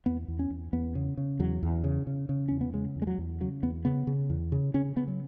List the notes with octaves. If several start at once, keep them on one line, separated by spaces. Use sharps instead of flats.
E2 B3
E2
C#4
E2
E2 B3
C#3
C#3
E2 F#3
E2
C#3
C#3
C#3
E2 C#4
B3
C#3 G#3
E2
G#3
F#3
E2
C#3 F#3
E2 B3
C#3 B3
C#3
E2
C#3
C#3 C#4
C#3 B3
F#3